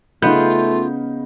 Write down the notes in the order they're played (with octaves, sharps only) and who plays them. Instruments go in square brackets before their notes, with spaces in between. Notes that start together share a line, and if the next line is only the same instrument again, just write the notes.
[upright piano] C#3 D#4 G6 [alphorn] A3 [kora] B3 [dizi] F4